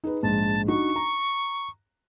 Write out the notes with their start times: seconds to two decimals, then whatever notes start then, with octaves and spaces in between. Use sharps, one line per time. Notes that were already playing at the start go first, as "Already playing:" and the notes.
0.04 D#4 G#4 B4
0.23 A#1 G#2 A5
0.68 D4 D#4 F#4 C#6
0.96 A#5